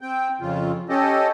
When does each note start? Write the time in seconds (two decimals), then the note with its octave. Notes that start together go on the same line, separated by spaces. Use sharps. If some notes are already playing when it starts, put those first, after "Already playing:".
0.01 C4 G5
0.41 F2 C#3 F4
0.89 C#4 G4 A4 D#5